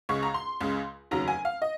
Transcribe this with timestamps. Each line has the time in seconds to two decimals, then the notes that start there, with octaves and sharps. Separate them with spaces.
0.09 C#2 C#3 G#3 C#6
0.23 A#5
0.34 C6
0.61 C#2 C#3 G#3
1.11 F1 D#2 C#3 F#3 A#5
1.28 G#5
1.45 F5
1.62 D#5